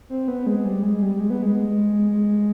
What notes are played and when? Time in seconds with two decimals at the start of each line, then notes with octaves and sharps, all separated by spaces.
0.10 C4
0.28 B3
0.46 G#3
0.65 G3
0.83 G#3
1.02 G3
1.20 G#3
1.30 B3
1.42 G#3
2.11 G#3